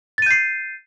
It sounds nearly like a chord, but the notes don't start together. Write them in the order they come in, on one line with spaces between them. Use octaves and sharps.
A6 D#7 G6 C7